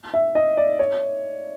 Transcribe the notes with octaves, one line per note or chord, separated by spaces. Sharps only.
E5
D#5
D5
C#5